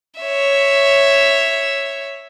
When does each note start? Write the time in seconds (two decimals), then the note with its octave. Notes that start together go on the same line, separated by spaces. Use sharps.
0.20 C#5 E5